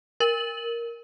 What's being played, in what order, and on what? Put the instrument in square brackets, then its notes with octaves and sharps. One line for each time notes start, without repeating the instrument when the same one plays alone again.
[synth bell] A#4 F#7